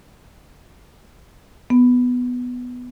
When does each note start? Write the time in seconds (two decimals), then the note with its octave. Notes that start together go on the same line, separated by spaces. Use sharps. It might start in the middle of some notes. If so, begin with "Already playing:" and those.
1.70 B3